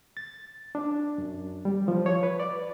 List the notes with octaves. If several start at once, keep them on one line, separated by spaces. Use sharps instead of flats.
A6
D4
F#2
G3
F3
C#5
B4
D5